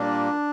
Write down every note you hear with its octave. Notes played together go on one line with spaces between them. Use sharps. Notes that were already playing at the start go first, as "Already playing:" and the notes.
Already playing: A#2 G3 A#3 D4